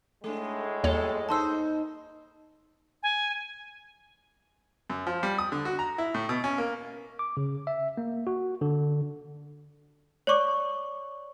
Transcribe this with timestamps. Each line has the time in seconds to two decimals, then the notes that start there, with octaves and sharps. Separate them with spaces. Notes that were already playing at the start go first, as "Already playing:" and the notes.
0.24 A2 G#3 A3 D4
0.84 D#2 G3 F4 A4 C#5
1.29 A#3 D#4 C5 A5 C6 E6
3.03 G#5
4.90 F#2
5.07 F3
5.23 G3
5.38 D#6
5.52 D3
5.65 F#4
5.79 A#5
5.98 E4
6.14 A2
6.29 B2
6.44 C#4
6.58 A#3
7.19 D6
7.37 C#3
7.67 E5
7.98 A#3
8.27 F#4
8.61 D3
10.27 C#5 D5 C#6 D6